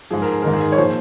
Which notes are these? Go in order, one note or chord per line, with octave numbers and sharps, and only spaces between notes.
G#2 F3 G#4
A#4
G#4
G#2 D#3 A#4
G#4
C#5
A#2 F3 C5